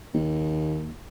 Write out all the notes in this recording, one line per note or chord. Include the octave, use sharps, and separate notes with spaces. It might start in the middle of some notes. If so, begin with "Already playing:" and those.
D#2